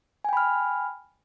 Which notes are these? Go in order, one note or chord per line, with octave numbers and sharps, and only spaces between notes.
G5 G#5 B5 F6